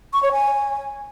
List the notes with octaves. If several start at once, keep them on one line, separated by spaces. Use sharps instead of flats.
C#6
C#5
G#5